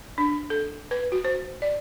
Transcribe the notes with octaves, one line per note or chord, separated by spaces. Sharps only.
D4
A4
B4
F#4
C5
D5